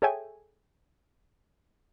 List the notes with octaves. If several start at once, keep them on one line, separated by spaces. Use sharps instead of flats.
G#4 A4 C#5 E5 G5 G#5